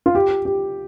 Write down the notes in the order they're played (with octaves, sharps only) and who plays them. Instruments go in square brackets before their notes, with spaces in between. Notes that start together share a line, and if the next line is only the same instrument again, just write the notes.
[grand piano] F4
G4
G4